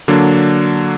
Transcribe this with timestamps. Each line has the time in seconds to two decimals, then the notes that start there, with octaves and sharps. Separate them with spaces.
0.08 D3 F#3 A#3 D4